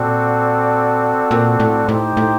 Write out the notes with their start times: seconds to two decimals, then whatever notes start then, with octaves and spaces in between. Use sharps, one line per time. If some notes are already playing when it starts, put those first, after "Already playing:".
Already playing: A#2 C4 F#4 A4 D5
1.31 A#2
1.60 A2
1.88 A2 D#4 G4 C5 G5
2.17 A2